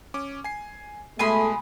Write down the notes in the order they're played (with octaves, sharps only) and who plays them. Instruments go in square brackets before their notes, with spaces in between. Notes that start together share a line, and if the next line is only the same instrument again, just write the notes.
[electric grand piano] C#4 D6
G#5 C7
[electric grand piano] B2 G#3 D#6 [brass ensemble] A3 [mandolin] G#5 B5 C6